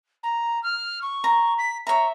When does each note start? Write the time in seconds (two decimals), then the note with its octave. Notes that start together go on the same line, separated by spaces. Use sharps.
0.23 A#5
0.63 F6
1.02 C#6
1.24 A#5
1.58 B6
1.87 C#5 E5 A#5